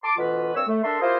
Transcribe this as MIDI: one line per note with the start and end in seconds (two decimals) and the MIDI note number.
0.04 0.17 81
0.04 0.17 84
0.04 0.17 86
0.17 0.53 38
0.17 0.53 47
0.17 0.53 52
0.17 0.53 65
0.17 0.53 71
0.54 0.62 36
0.54 0.62 43
0.54 0.62 60
0.54 0.62 73
0.54 0.62 85
0.54 0.62 88
0.67 0.79 57
0.84 1.00 62
0.84 1.00 69
0.84 1.00 70
0.84 1.00 76
0.84 1.00 84
1.00 1.18 64
1.00 1.18 65
1.00 1.18 67
1.00 1.18 68
1.00 1.18 70
1.00 1.18 72